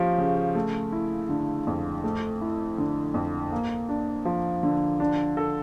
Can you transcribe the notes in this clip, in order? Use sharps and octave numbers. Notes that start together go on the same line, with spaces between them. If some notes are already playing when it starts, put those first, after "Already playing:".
Already playing: F3 C#4 G4
C#3
A3
E4
D3
F2
A3
E4
D3
F2
A#3
D4
F3
D3
D4
A4